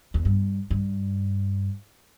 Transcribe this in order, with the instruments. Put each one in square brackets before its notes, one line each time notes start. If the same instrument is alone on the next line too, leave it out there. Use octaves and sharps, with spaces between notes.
[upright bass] E2
G2
G2